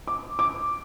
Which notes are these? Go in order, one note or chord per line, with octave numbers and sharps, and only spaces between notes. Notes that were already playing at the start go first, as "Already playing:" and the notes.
D6
D6